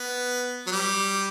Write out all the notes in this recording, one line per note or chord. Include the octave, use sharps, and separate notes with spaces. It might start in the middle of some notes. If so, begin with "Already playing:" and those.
Already playing: B3
F#3
G3